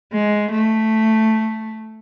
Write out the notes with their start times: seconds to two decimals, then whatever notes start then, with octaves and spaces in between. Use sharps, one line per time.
0.13 G#3
0.51 A3